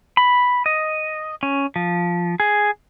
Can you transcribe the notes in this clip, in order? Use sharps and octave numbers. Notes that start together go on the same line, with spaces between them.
B5
D#5
C#4
F3
G#4